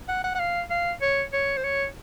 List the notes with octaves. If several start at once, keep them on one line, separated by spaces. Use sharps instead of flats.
F#5
F#5
F#5
F5
F5
C#5
C#5
C5
C#5